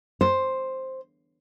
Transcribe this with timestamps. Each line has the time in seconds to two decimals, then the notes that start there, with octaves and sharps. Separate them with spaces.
0.21 C5